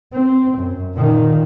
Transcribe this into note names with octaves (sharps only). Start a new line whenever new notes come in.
C4
F#2
A#2 D#3